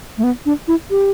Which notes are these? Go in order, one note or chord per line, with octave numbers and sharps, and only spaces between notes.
A3
B3
D4
E4
G4